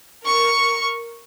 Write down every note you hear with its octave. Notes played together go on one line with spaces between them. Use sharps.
A#4 C#6